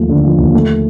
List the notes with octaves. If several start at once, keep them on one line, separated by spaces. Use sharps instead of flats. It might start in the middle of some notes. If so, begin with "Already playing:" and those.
Already playing: D#2 F3 A3
D3
F3
D#2
A3